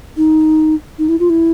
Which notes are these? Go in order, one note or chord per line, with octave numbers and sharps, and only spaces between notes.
D#4
D#4
E4
F4
E4